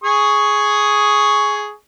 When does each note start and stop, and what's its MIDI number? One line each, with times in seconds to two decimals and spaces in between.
0.04 1.71 68
0.04 1.71 85
0.04 1.71 87